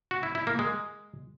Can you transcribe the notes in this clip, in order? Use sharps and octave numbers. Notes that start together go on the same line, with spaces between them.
F#4
E4
E4
A#3
G#3